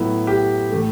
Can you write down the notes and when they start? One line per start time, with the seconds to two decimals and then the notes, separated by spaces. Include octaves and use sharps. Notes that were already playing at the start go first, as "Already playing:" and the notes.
Already playing: A2 F#3 B3 E4
0.27 G4
0.71 A2 E3 A3